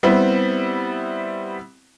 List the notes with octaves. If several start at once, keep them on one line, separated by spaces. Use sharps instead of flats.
G3 B3 C4 E4